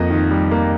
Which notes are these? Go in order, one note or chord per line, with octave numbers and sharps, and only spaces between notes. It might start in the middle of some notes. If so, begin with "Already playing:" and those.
Already playing: F2 A#3 D#5
D#3
G3
A#3